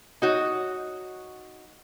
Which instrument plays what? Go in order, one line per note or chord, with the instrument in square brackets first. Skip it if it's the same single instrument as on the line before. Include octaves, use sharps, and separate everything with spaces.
[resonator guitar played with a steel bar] D#4 F#4 C#5